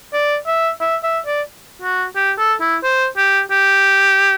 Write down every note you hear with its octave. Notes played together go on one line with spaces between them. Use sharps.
D5
E5
E5
E5
D5
F#4
G4
A4
E4
C5
G4
G4